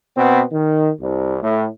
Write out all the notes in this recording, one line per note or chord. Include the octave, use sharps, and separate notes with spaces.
B2 B3 C4
D#3
C2
A2